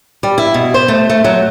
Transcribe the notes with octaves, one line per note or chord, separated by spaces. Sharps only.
G3
E4
B2
C5
A3
A3
F#3